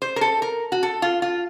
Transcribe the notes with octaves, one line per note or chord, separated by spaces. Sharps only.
C5
A#4
A4
A#4
F#4
A4
F4
F4